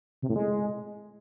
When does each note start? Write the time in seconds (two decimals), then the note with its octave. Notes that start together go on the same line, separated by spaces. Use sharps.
0.22 C3
0.29 A2
0.36 G#3